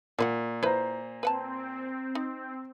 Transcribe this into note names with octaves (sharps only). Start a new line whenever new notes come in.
A#2 A#3 B4 F#5
E4 B4 C5 A#5
C4 B4 F#5 A5
D#4